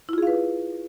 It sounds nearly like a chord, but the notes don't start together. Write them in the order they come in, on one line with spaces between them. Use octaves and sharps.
E4 F4 G#4 F5 B4